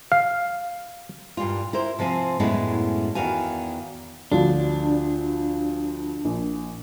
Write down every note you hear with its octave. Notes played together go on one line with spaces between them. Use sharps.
F5
G2 A#2 G3 F4
E4 A#4 C5
C3 F3 C4 G#5
F#2 A2 G#3 B3 C#4 E4
E2 D#3 F#4 F5 G#5
D2 F3 D4 F#4
A#1